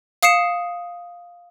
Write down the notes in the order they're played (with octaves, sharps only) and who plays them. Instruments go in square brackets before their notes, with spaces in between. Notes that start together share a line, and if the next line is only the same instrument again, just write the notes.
[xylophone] F5 D#6 C7 C#7 E7